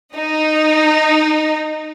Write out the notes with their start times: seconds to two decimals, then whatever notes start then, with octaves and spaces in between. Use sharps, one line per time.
0.15 D#4